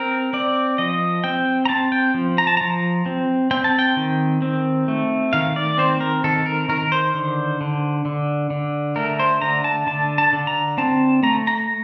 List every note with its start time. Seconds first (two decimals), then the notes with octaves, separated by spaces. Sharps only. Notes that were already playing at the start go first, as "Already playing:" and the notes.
Already playing: C4 A#4
0.33 C4 D5
0.78 F3 D#5
1.24 C4 G5
1.65 A#5
1.69 C4 A5
1.92 G5
2.14 F3
2.38 A#5
2.47 A5
2.57 F3 A#5
3.06 C4
3.51 C4 G5
3.64 A5
3.79 G5
3.97 D#3
4.42 C4
4.88 A3
5.33 D#3 F5
5.56 D5
5.78 C4 C5
6.01 A#4
6.24 D#3 A4
6.46 A#4
6.69 D#3 A#4
6.92 C5
7.14 D3
7.61 D3
8.05 D3
8.50 D3
8.96 A3 A#4
9.19 C5
9.41 D3 A#5
9.64 A5
9.87 D3 A5
10.18 A5
10.33 D3
10.47 A#5
10.78 C4 A5
11.23 A3 A#5
11.47 A#5